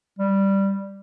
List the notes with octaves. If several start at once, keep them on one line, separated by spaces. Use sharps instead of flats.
G3